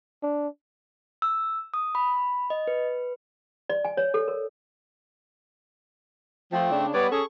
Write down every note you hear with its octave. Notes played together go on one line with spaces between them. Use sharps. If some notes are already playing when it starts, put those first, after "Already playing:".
D4
E6
D#6
B5
D#5
B4
D5
G#5
C#5
A4
A#4
F3 A3 C4
C#3 D4
G3 B3 B4 C#5 D5 D6
C#4 G#4 A4 C#6